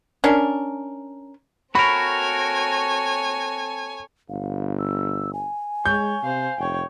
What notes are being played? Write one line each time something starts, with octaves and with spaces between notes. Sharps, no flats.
C#4 D4 A#4
C4 F#4 A4 A#4 C#5 G#5 B5
G1 F5
E6
G#5
G#3 C#5 G6
C3 C5 F5
F1 C#5 G5